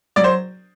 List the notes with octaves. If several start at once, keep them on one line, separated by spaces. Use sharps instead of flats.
F#3 D5
C5